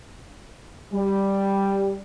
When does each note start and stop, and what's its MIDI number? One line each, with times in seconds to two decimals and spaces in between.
0.94 2.01 55